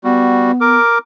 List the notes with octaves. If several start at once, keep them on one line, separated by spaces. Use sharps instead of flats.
G3 B3 F#4
A#4 D6